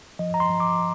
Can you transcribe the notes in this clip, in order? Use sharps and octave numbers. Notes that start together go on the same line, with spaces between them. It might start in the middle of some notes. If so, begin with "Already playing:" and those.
F3 D#5
A#5
C6
F3
D6